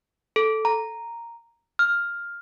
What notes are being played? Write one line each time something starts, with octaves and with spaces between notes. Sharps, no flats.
A4
A#5
F6